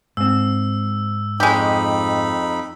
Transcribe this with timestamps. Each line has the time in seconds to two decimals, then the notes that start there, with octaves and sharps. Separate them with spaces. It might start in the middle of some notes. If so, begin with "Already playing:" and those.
0.17 G#2 C4 E6
1.40 F2 G#3 D#4 G4 B5